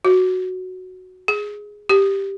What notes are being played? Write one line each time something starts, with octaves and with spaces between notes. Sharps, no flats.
F#4
G#4
G4